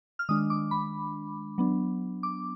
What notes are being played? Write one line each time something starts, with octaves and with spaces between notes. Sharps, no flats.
F6
D#3 G#3 D4 D#6
D6
B5
F#3 B3 D4
D6